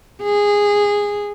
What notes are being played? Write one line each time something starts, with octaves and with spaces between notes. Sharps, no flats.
G#4